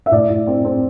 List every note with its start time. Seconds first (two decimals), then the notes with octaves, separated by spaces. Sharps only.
0.06 E5
0.11 A2 D5
0.30 A2
0.47 C4
0.65 C4